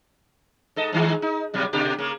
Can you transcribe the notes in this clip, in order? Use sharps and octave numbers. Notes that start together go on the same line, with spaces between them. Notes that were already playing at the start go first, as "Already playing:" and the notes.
G#2 A4 D#5
G#2 D#3 G#3
D#4
B2 F#3 G3
B2 D3 G4
C#3 A#3